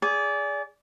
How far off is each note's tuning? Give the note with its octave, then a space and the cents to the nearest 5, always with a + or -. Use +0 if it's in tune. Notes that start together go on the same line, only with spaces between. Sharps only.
G#4 +0 D5 -25